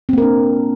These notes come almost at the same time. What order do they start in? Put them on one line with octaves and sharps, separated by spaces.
C4 A#3 A#4 D4